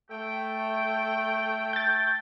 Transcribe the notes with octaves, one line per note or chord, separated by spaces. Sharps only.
A3 G5
G6 A6